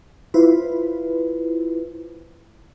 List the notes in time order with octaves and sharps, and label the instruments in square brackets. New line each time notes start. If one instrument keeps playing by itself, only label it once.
[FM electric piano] E4 F4 B4 C5